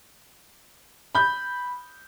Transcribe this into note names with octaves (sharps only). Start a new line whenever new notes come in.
B5 G6